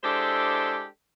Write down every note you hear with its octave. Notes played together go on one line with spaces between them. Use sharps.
G#3 D4 E4 G4 A4 C5